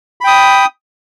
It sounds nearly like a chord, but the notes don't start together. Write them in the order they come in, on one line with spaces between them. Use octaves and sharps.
B5 G5 D#6